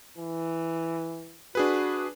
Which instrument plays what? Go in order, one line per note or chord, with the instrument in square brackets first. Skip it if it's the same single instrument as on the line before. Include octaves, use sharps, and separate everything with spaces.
[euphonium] E3
[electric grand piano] D4 G#4 B4 [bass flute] F#4